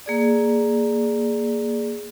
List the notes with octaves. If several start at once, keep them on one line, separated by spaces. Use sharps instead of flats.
A#3 G#4 D5